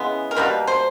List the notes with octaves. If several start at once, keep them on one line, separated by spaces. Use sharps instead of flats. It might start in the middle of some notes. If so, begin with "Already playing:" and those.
Already playing: C#3 E3 G#3 B3
A#4
B2 G3 A#3 B4
C5